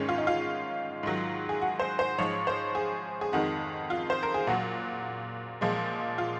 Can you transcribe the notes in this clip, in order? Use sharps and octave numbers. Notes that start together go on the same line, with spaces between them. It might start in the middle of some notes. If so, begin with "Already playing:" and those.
Already playing: G#2 D#3 G#3 C#4
F4
D#4
F4
G#2 D#3 F#3
G#4
F#4
C5
C5
G#2 F3 G#3 C#5
C5
G#4
G#4
F2 D#3 G#3 F#4
F4
C5
A#4
G#4
A#2 F#3 F#4
A#2 F3 G#3
F4